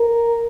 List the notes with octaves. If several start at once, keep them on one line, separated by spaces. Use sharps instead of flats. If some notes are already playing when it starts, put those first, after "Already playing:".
Already playing: A#4